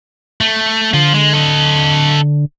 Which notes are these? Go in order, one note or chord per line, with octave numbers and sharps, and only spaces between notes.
A3
D3 F3 F4
G#3
A4 D#5